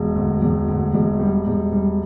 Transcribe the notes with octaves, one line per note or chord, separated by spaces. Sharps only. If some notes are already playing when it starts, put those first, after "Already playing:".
Already playing: E1
D2
E1
D2
E1
G3
E1
G3